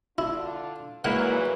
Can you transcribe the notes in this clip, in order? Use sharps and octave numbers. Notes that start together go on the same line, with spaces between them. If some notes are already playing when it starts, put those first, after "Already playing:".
D3 D4 E4 F4
A#2 E3 F#3 G#3 A#3 E4 B4 F#5